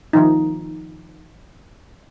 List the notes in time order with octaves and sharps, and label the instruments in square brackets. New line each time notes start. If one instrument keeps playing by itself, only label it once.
[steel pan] D#3 F3 D#4